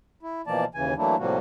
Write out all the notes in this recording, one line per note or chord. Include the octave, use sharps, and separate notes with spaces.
E4
B2 E3 F3 A#3 D5 A5
D#2 C#3 E3 G#5
E3 F#3 A3 A#3 D4 E4
A2 C3 F3 G3 A#3 F#4